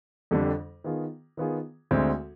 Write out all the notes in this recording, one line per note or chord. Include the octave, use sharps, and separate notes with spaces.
F2 D3 G3 D4
D#3 B3 F4 G#4
D#3 B3 F4 G#4
D2 D3 G#3 C4